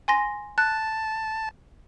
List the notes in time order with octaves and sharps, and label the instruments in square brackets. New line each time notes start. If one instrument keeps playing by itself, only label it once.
[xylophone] G#5 C6 A#6
[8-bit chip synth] A5 [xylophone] F#6